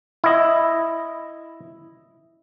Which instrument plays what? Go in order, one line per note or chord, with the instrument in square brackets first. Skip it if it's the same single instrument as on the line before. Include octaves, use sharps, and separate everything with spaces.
[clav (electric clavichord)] E4 D#5